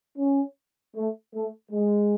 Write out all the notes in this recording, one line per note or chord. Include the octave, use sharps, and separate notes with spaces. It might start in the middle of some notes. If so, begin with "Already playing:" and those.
C#4
A3
A3
G#3